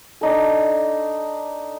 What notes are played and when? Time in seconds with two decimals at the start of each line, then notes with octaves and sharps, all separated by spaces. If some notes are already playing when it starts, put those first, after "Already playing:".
0.21 D4 D#4 A4